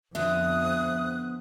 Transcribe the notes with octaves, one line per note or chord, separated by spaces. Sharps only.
F2 D3 F3 B3 E5 D#6 F#6